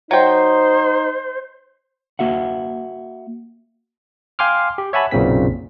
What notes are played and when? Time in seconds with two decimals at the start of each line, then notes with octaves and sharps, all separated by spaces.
0.11 F#3 D#4 C5 G5
2.19 A#3 F#4 E5 F#5
4.39 F5 G5 G#5 C6 D6 F6
4.78 G4
4.93 C#5 E5 F#5 G#5 A5 B5
5.11 B1 F#2 A#2 C#3 C4 B6